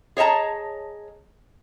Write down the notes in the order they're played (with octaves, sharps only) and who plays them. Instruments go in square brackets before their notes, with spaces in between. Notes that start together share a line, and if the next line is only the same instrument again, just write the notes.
[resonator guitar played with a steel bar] G#4 C#5 D#5 A5 A#5